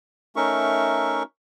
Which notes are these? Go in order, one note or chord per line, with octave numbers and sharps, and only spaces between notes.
A3 C#4 D#4 A#4 E5 C#6